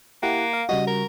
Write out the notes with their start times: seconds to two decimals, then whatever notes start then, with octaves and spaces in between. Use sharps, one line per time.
0.23 A#3 E4 G4 F#5
0.53 F5
0.69 C#3 G3 F#4 D#5
0.87 A#4